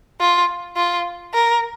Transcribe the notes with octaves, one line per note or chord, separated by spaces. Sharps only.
F4
F4
A#4